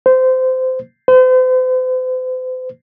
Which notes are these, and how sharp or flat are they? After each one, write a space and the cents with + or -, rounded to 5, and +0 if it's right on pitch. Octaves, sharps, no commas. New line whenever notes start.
C5 -20
C5 -40